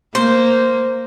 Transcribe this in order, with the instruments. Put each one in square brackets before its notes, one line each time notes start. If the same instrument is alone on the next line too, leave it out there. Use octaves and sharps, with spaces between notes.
[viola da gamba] A#3 [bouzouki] C5